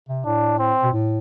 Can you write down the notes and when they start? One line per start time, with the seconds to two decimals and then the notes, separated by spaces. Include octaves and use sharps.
0.09 C3
0.25 A2 D4
0.59 C4
0.83 B2
0.93 A2